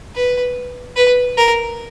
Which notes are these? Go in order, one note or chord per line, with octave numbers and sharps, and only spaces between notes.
B4
B4
A#4